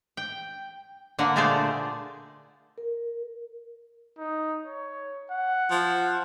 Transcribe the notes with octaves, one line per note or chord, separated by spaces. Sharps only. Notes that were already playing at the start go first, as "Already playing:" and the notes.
G5
D3 A#3 F#5
A#2 A3 F4 G#4 C5 D5
A#4
D#4
C#5
F#5
F3